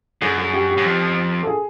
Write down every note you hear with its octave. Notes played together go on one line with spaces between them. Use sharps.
F#2 G#4
G#4
G4
G4
F#2
F2
A4
G#4